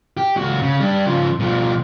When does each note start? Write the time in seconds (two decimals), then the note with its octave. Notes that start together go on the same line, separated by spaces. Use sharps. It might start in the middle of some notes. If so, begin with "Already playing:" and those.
0.17 G4
0.37 C#2 F#4
0.62 C#3
0.80 G3 D4
1.06 C#3 F3
1.39 B2 F3